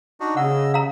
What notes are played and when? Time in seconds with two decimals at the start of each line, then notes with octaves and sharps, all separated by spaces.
0.20 D4 D#4 F#4
0.37 C#3 D#5 F#5 E6
0.74 F5 A#5